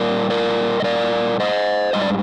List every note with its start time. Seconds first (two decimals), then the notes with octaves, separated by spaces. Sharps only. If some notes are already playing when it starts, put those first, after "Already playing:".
Already playing: A#2 G3 A#4 D5
0.30 A#4 D5
0.80 D#5
0.84 A#4 D5
1.40 C5 D#5
1.93 G#2 G3 D#5
2.02 D5